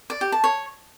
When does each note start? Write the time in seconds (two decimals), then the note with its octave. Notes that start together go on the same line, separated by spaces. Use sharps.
0.10 D5
0.21 G4
0.32 A5
0.44 C#5